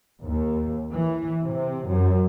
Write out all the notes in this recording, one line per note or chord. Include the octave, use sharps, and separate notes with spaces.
D#2
E3
C3
F#2